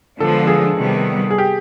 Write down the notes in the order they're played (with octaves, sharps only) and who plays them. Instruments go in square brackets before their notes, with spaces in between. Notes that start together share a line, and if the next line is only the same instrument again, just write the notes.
[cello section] D3 F3 G#3 B3 D4 [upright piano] A4
[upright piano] G#4
[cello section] C3 D#3 G3 B3
[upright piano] G#4
G4